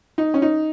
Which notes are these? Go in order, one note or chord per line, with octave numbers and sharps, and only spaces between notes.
D#4
C#4
D#4